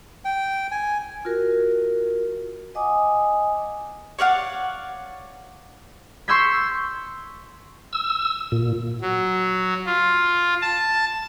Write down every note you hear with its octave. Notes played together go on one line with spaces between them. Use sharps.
G5
G#5
F4 F#4 A#4
D#5 F#5 G#5 D6 D#6
C#5 D5 F5 F#5
C6 C#6 E6 G6 G#6 B6
E6
A#2
F#3
F4
A5